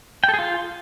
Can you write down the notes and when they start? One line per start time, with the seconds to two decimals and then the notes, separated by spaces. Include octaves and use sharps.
0.24 G5
0.29 A4
0.34 G#4
0.39 F4